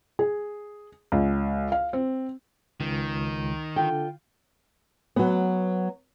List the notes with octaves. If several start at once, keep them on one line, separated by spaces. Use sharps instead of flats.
G#4
C#2
F5
C4
C#2 D#3
D3 F4 G5
F#3 B3